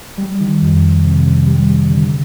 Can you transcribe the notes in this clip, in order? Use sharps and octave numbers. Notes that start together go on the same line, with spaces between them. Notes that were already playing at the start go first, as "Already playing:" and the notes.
G3
D#3
F2
F2
C3
C3
G3
C3
D3